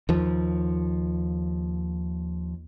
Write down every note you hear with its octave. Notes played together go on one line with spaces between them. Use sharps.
D#2 F3